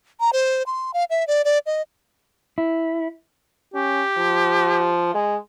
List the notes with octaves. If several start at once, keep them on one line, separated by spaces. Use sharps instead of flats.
A#5
C5
C6
F5
E5
D5
D5
D#5
E4
C#4 G4
F3
G#3